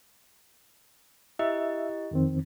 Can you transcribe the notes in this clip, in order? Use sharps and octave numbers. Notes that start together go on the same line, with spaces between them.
E4 G4 D#5 E5
F2 D#3 C4